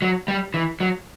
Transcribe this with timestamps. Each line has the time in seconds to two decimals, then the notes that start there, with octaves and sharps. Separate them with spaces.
0.02 F#3
0.28 G3
0.54 E3
0.80 F#3